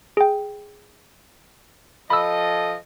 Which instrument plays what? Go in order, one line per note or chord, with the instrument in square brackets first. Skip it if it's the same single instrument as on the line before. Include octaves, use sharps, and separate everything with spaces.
[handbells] G#4 G5
[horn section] F3 A4 D#5 [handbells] B5 E6